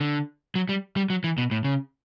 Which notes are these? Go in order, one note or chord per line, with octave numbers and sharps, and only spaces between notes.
D3
F#3
G3
G3
F#3
E3
B2
A2
C#3